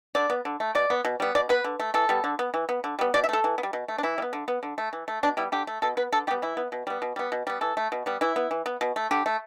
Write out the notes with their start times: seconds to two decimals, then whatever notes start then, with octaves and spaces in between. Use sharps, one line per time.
0.15 D3 D5
0.30 B3
0.45 D3
0.60 A3
0.75 B2 D5
0.90 B3
1.05 B2
1.20 G3 B3
1.35 B2 D5
1.49 B3 B4
1.64 D3
1.80 A3
1.94 E3 A4
2.09 G3 B3
2.24 D3
2.39 B3
2.54 E3
2.69 B3
2.84 D3
2.99 G3 B3
3.14 B2 D5
3.24 E5
3.29 A3 A4
3.44 E3
3.58 B3
3.63 G3
3.73 B2
3.88 A3
3.98 D4
4.03 E3 E4
4.18 G3
4.22 B3
4.33 D3
4.48 B3
4.63 D3
4.78 A3
4.93 E3
5.08 A3
5.23 B2 D4
5.37 G3 B3 E4
5.52 D3 G4
5.67 A3
5.82 B2 A4
5.97 B3 B4
6.12 D3 A4
6.27 G3 G4
6.31 B3
6.42 E3 E4
6.57 B3
6.72 B2
6.87 G3 B3
7.02 B2
7.16 G3 B3
7.32 B2
7.47 G3 B3
7.61 E3 A4
7.77 A3
7.92 B2
8.06 G3 B3
8.21 E3 E4
8.36 B3
8.51 E3
8.66 B3
8.81 B2
8.96 A3
9.11 D3 G4
9.26 A3